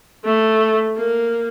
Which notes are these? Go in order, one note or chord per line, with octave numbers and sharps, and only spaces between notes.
A3
A#3